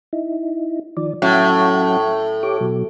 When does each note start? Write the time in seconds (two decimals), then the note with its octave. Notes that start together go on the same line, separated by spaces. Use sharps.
0.13 D#4 E4
0.97 D#3 F3 D5
1.22 A2 F#3 C#4 F#5
2.43 G4 C#5 D6
2.61 B2 F#3